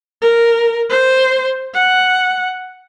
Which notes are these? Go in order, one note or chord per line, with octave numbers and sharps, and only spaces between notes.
A#4
C5
F#5